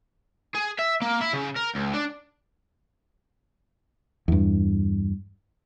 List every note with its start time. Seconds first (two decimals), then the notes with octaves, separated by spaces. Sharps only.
0.54 G#4
0.79 E5
1.02 A#3
1.21 E4
1.33 C#3
1.56 A#4
1.75 C#2
1.94 D4
4.28 E2 G2